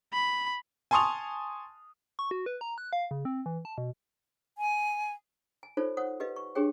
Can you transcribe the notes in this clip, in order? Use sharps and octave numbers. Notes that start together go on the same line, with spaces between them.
B5
G#5 A5 C6 C#6 D#6 F7
C#6
F#4
B4
A#5
F#6
F5
C#3
C4
E3
A5
B2
G#5
G#5
D#4 F4 A4 C5 C#5
C5 C#5 F#5 D#6
G4 B4 D#5 F5
C#6
D4 G4 G#4 C#5 G5